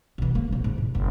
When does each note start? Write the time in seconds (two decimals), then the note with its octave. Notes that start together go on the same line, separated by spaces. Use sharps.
0.18 B1 E3
0.35 F#3 A#3
0.52 A#1 D#4
0.64 G#2
0.78 B1
0.95 F#1